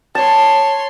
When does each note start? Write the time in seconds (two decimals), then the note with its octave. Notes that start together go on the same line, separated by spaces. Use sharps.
0.15 C#5 A5 C6